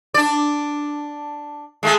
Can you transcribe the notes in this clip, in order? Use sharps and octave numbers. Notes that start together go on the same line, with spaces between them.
D4 D5
G#3 A3 G#4